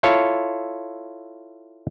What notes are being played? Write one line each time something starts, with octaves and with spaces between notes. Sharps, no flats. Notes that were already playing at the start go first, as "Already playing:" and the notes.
E4 F4 A4 C#5 F5